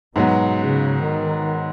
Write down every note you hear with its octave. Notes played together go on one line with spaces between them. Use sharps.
G#2 B2 F#3 B3
C#3
D#3